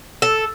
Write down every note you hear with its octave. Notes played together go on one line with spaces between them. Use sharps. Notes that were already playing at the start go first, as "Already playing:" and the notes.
A4